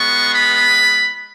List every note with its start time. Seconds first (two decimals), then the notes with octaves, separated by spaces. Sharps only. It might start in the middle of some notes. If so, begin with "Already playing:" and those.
Already playing: G#3 B3 F4 C#6
0.33 B5